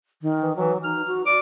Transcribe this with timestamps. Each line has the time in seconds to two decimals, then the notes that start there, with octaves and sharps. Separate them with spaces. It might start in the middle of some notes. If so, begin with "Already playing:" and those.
0.22 D#3
0.42 E3
0.56 E3 F#3
0.84 D#4 F6
1.07 F#4
1.26 D5 D6